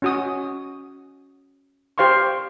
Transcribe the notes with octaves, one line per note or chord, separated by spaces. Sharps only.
C#4 F#4 D#6
G4 C5 F5 C6 C#6